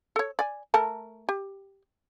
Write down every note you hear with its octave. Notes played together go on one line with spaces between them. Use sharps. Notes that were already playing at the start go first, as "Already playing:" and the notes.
A4 C#5
D5 G#5
A3 A#4 A5
G4